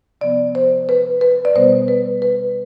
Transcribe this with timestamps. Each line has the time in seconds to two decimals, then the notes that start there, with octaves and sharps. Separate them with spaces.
0.21 C3 F3 B3 D5
0.55 C5
0.89 B4
1.21 B4
1.45 D5
1.56 B2 G3 B3 C5
1.88 B4
2.22 B4